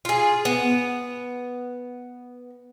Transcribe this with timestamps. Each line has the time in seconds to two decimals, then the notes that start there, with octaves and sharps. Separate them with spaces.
0.05 F4 G#4
0.45 B3